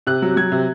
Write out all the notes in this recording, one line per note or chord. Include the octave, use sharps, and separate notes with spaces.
C3 F#6
F#3
F#3 G#6
C3